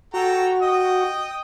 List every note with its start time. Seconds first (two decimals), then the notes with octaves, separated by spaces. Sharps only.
0.14 F#4 A4 G5 A#5
0.62 D#5 G5 D#6